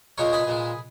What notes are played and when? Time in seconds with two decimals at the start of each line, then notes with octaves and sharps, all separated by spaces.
0.18 A#2 G#3 A#4 C#5
0.33 G#4 B4
0.47 A#2 G#3